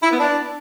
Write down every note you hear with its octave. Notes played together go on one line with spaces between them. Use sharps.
E4
B3
D4